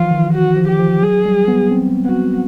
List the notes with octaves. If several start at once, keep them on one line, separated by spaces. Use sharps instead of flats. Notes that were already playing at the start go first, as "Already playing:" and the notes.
Already playing: E3 F3 F4
D#3
F#4
F3
G4
F3
F#3 G#4
G3
B3
C4
B3 F#4